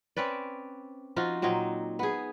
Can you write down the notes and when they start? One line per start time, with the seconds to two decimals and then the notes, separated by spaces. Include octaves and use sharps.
0.16 C4 C#4 B4 D5
1.16 F3 D#4 F4 F#4
1.42 A#2 F#3 C4 D#4
1.99 B3 G#4